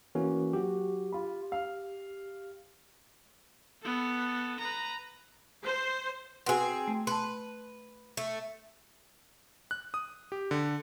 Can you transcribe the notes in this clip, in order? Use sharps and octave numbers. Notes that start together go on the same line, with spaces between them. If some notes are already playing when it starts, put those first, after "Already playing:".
E3 A#3 C#4 F#4
F#3 F#4 G4
F4 B5
F5
B3 A4
B4 A#5
C5
C4 F#4 G#4 B4 F#5
A3
B4 A5 C6
A3
F#6
D#6
G4
D3